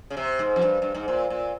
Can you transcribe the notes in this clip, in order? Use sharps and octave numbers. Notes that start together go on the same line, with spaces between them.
C#3
C3
G#2
F2
G2
G2
G#2
A#2
A#2